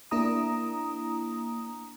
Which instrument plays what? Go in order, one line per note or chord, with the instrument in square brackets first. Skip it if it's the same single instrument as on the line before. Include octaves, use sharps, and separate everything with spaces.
[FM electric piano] A#3 D4 E4 A#5 D#6